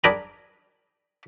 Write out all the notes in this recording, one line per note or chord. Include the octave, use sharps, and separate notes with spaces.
D4 G#4 A#4 G5 A#5 B5